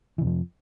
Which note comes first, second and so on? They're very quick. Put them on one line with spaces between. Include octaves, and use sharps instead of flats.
E3 C3 F2 F3